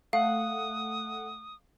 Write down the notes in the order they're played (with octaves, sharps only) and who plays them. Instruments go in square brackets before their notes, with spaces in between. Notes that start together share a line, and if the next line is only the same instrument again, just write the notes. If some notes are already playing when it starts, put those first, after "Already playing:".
[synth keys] A3 F#5 [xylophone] F5 [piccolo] D#6